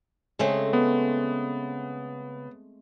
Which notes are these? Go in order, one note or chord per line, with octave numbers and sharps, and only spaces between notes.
C#3 G#3 A3 C4
B3